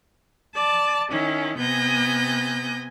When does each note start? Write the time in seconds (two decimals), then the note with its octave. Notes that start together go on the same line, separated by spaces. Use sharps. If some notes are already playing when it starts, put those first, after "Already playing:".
0.55 D5 A5
1.10 D#3 C#4 E4
1.57 C3 B3 G#5 G6 A#6